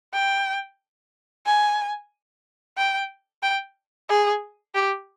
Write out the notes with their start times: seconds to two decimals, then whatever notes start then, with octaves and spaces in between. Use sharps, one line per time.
0.14 G5
1.46 G#5
2.78 G5
3.43 G5
4.10 G#4
4.75 G4